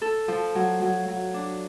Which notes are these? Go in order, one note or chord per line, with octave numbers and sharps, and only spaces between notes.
A4
F3
F#3
F#3
F#3
D4